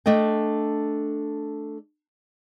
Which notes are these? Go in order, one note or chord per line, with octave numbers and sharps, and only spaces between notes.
A3 D4 D#5 G5